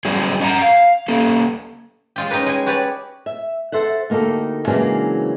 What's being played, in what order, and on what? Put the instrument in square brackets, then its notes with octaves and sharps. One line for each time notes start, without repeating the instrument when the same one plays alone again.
[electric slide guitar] F#3 G3 C#4 G#4 D5
C#4 D4 D#5 F#5 A#5
F5
A#3 C#4 A4
[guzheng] G#3 F4 G4
C#4 D#4 G4 A#4 B4
G#3 G#5
F#4 G4 B4 C#5 D5
[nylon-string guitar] E5
A4 C5 E5 F#5
D2 A#3 D#4 G4 A4
C#3 E3 F#3 G#3 A#3 D4